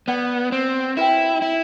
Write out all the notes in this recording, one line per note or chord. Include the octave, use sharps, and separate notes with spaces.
B3 B4 D5 F#5
C4
E4 F#4 B4 E5 G5
E4